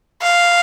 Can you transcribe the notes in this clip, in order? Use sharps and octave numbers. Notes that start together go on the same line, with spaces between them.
F5